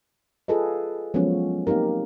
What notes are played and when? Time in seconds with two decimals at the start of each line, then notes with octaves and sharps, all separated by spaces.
0.48 F4 G#4 A4 B4 D#5
1.14 F3 F#3 G#3 B3 C#4
1.67 A#3 C4 D#4 G4 A#4